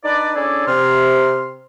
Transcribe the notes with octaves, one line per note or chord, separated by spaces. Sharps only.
D4 D#4 B4 D5
C#4 D4 E4 G#4 A4 D5
C3 C6 F6